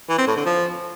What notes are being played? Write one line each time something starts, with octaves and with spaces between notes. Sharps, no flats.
E3
C4
A2
D3
F3